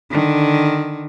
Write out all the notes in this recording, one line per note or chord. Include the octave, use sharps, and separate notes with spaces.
D3 D#3